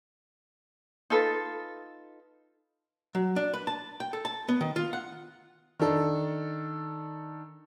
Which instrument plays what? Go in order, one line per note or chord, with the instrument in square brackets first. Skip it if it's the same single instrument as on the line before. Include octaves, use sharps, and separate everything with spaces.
[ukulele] D#4 F4 A4 B4
[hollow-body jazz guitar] F#3
D4
B4
A5
G5
A4
A5
B3
D#3
F4
F#5
[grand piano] D#3 D4 A4